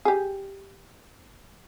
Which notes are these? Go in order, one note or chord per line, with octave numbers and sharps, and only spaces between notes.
G4 G#4